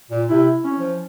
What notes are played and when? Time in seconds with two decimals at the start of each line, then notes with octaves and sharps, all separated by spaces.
0.10 A#2
0.28 C3 E4
0.65 C#4
0.78 F3